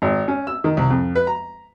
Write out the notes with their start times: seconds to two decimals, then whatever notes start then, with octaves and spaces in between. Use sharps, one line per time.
0.02 G#1
0.28 C#4
0.47 E6
0.64 D#3
0.77 C2
0.90 F2
1.15 B4
1.27 A#5